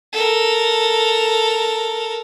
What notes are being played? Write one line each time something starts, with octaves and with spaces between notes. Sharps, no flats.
A4 A#4